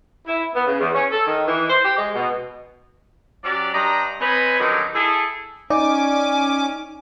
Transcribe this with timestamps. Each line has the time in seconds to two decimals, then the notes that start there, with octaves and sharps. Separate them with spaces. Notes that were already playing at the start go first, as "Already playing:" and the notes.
0.27 E4
0.54 B3
0.66 C#3
0.79 E2
0.94 C#4
1.11 A4
1.26 D#3
1.47 E3
1.70 C5
1.85 G4
1.98 G#3
2.15 B2
3.44 F#3 C#4 G4 D5
3.73 G2 D5 D#5 A#5
4.20 C4 B4 C#5 D#5 G#5 B5
4.59 D3 D#3 F#3 G3 C#4 D#4
4.94 E4 G#4 A4
5.70 C#4 D#4 D5 G#5 D6